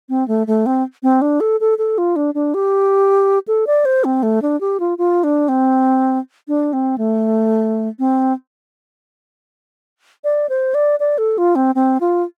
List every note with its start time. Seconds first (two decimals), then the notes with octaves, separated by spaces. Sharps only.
0.09 C4
0.28 A3
0.47 A3
0.66 C4
1.03 C4
1.22 D4
1.40 A4
1.60 A4
1.78 A4
1.98 F4
2.16 D4
2.35 D4
2.54 G4
3.48 A4
3.67 D5
3.85 C5
4.04 C4
4.23 A3
4.42 D4
4.61 G4
4.80 F4
4.98 F4
5.24 D4
5.49 C4
6.48 D4
6.73 C4
6.98 A3
7.99 C4
10.24 D5
10.49 C5
10.74 D5
11.00 D5
11.18 A4
11.38 F4
11.56 C4
11.75 C4
12.01 F4